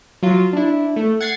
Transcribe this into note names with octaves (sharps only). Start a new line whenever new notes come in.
F#3 F4
D4 E4
A3
F#5 G#6 A6 C7